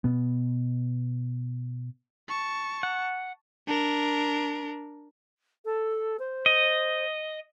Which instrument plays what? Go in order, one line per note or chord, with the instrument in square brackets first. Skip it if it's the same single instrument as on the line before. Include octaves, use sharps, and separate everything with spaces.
[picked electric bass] B2 B3
[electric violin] A5 C#6
[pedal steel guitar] F#5
[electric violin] D4 A#4
[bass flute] A4
C5
[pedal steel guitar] D#5